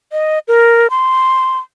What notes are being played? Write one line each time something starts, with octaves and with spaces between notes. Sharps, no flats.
D#5
A#4
C6